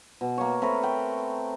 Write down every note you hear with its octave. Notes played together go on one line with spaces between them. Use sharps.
B2
A#3 C#5
A3 C4 A#4 B4
G5